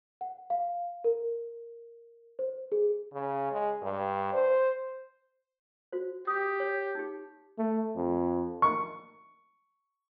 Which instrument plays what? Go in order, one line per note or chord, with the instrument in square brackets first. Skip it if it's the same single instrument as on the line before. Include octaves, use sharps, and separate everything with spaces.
[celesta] F#5
F5
A#4
C5
G#4
[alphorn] C#3
G#3
G2
C5
[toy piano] F#4 C5
[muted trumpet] G4 [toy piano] D#6
[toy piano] C#5
D#4 G4
[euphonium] A3
F2
[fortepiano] C#6